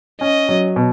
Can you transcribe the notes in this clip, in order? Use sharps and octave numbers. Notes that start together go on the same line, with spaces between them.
C#4 D#5
F#3
B2